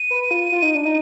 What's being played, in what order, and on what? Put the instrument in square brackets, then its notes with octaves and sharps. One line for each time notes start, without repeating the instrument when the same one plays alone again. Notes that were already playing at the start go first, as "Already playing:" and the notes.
Already playing: [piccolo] D#7
[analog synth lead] B4
F4
F4
D#4
D4
D#4